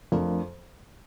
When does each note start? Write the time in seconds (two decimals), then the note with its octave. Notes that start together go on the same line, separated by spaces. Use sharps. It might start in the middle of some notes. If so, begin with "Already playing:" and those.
0.12 F2 F3 A3 D4 F4 A#4